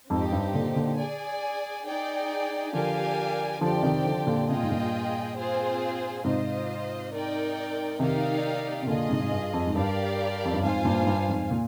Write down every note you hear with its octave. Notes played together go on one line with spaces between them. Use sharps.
F2 G#2 C4 D#4 G4
G2
A#2 D3
A#2 D3
G#4 D5 G#5
D#4 G#4 D5 G5
D3 F3 G4 A#4 D5 F5 G#5
D3 F3 C4 G4 D5 G5
C3 D#3
D3 F3
A#2 D3
C3 F4 G#4 D#5 G5
A#2
G#2
G2 A#2
C4 F4 G#4 C5
G#2 C3 F4 C5 D#5
D#4 A#4 D5 G5
C3 D#3 A#3 D#4 G4 D5 F5
C3
A#2 D3 F4 G#4 D#5
G#2 C3
G#2
G2
F2
G#2
G2 G4 A#4 D5 F5
F2
G2
F2 G#2 F4 C5 F5 G#5
G2 A#2
G#2
G2
F2 G#2
A#2